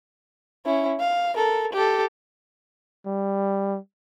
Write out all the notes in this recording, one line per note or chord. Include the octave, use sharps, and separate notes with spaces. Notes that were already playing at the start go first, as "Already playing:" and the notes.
C#4 E4
F5
A4 A#4
G4 A4
G3